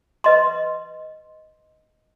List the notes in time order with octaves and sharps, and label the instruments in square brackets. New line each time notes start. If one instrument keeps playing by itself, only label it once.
[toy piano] B4 D#5 C6